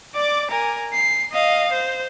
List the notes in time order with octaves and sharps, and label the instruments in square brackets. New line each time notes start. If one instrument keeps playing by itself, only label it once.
[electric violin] D5 D6
A#4 G#5
C7
D#5 F5
C5